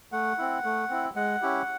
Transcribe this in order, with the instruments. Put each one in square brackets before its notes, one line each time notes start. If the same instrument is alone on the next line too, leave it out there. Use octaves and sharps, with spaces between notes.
[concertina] A3 F#5
C4 E4
A3
C4 E4
G#3 F#5
C#4 E4 G4